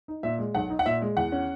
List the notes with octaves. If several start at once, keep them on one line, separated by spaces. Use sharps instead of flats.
D#4
A#2 E5
G#3
B1 F#5
D#4
F#5
A#2 E5
G#3
E2 F#5
C#4